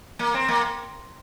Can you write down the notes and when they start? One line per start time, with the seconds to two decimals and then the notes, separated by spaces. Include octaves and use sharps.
0.19 A#3
0.34 C4
0.48 A#3